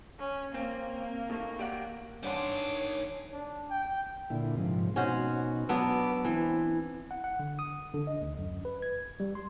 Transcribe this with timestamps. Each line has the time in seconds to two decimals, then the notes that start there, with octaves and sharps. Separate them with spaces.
0.19 C#4
0.54 A#3 C4
1.30 D#2 A3
1.59 G4 D5 F#5
2.23 G2 D#3 D4 G#4 C#5 F#5 C6 D6
3.33 D4
3.70 G5
4.30 A#2 D3 E4
4.57 G#2 C3 F3
4.96 B2 C#4 D#4 F#4 C5
5.69 F#3 B3 D4 B4 D6 E6
6.25 E3 C4
7.11 F#5
7.24 F#5
7.39 D3
7.59 D#6
7.94 D3
8.07 D#5
8.21 D2
8.38 F#2
8.65 B4
8.82 G#6
9.20 G3
9.35 C6